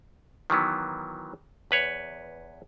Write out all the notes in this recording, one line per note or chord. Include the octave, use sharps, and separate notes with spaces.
D#3 E3 F#3 B3
E2 B4 C#5